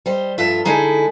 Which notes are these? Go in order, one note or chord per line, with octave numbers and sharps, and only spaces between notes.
G3 C5 D#5
G2 F3 F4 A4 E5
D3 G#3 D#4 E4 G#4 A4